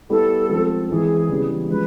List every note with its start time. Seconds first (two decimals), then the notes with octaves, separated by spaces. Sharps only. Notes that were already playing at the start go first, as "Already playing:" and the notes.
0.10 G3 B3 E4 A4
0.50 F3 G#3 C4
0.89 E3 G#3 C4 G#4
1.29 C#3 E3 G3 B3
1.69 F3 G#3 C#4 B4